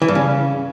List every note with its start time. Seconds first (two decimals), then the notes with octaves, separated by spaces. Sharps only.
0.02 E3
0.08 G2
0.15 C#3